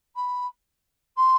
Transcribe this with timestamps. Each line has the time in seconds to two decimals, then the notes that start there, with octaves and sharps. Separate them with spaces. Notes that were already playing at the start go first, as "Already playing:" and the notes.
0.16 B5
1.17 C6